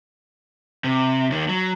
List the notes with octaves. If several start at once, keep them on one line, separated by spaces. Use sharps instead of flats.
C3
D#2 D#3
F#3